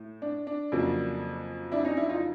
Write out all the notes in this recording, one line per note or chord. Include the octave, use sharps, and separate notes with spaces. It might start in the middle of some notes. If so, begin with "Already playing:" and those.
Already playing: A2
D4
D4
F2 C#3 F#3 A#3
D4 E4
C#4 D#4
D4 E4
D#4 F4